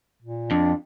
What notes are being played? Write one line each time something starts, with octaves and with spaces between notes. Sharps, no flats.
A#2
F2 D4